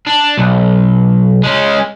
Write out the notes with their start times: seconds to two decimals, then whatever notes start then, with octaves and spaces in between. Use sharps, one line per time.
0.07 D4
0.38 B1
1.44 G#3 C#4